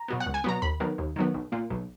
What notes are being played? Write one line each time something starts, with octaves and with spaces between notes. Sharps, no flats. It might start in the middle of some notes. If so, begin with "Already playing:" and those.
Already playing: A#5
B2 F#3 B3
F#5
C#2
G#5
B2 F#3 B3 A#5
D#2 B5
D#3 F#3 B3
D#2
D#3 F#3 B3
B1
A#2 A#3
B1